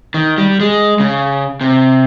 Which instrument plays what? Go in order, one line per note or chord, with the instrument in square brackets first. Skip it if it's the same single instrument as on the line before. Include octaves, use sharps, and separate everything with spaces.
[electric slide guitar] D#3
G3
G#3
C#3
C3